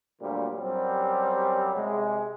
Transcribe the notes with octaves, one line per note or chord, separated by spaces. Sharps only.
D2 A#2 D3 F#3 G3
F#2 F#3 G3 C4 G4
C3 G#3